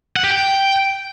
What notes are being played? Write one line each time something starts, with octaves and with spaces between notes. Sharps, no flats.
F#5
G4
G5